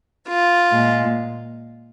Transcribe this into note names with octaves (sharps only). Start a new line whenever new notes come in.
F4
A#2 G#3